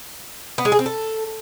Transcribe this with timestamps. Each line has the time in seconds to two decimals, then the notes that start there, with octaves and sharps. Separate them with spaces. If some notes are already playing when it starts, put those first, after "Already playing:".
0.58 B3
0.65 G#3
0.72 G#4
0.79 C4
0.86 A4